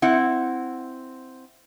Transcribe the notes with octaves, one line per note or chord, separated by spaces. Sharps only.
C4 E4 F#5